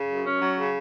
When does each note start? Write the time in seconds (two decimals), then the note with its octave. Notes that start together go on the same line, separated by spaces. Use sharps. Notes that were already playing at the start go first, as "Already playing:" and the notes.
Already playing: C#3
0.09 F#2
0.25 C#4
0.41 F#3
0.58 C#3